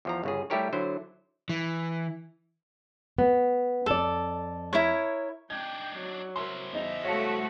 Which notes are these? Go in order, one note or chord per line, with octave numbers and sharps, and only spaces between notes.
E2 F3 A#5
G1 C#3 G#4
G3 A3 E4 G4 A#4 C#5
D3 F#3 E4 C5
E3
B3
F2 A4 D5
E4 A#4 C#5
D4 D#4 G5 G#6
F#3
E4 A#4 C5 E5 C6
E2 D#4 E5 F7
A3 F#4 C#5 F5 A5